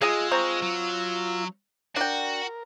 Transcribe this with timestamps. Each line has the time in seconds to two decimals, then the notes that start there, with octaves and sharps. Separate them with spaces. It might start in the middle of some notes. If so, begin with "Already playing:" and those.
0.01 G#3 F4 G#4 D#5 G#5 E6
0.31 C4 A#5 C#6
0.62 F#3
1.96 D4 F#4 A#4 G5